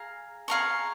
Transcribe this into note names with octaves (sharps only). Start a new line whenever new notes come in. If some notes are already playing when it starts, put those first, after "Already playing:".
Already playing: G#4 F5 A#5
G#4 F5 A#5 C#6